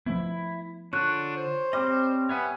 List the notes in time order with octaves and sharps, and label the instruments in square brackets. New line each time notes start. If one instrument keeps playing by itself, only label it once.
[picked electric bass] F3 A3 B3 [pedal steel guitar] E4
[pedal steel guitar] D3 F4 F#6 [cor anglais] D4 [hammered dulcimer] C#5
[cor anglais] C5
[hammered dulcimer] G3 [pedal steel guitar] C4 D#5
[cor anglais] B3 [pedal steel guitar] C#5 E5 G#5